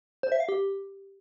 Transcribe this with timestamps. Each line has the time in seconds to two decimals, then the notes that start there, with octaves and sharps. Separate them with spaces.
0.23 C5
0.32 E5
0.40 F5
0.49 G4